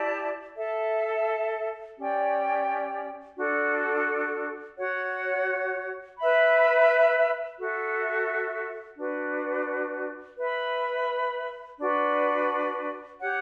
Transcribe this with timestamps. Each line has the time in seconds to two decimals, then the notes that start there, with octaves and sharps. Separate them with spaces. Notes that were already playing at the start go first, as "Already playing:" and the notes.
Already playing: E4 G4 D5 A5
0.56 A4 E5 A5
1.97 C#4 G4 D5 G5
3.37 D4 F#4 A4
4.77 F#4 C#5 F#5
6.18 B4 E5 B5
7.58 F#4 A4 E5
8.98 D4 F#4 B4
10.38 B4 E5 B5
11.79 D4 F#4 B4
13.20 G4 C#5 F#5